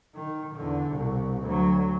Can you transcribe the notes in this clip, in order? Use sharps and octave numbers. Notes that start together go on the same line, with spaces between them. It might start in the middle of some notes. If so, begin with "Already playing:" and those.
D#3
E2 D3
C2 B2
D2 F#3